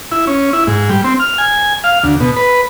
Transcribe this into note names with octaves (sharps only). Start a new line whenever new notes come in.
E4
C#4
E4
G#2
G3
C4
F6
G#5
F5
D2
B2
B4